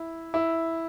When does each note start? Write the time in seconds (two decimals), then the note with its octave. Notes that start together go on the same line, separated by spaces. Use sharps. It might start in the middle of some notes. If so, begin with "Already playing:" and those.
Already playing: E4
0.34 E4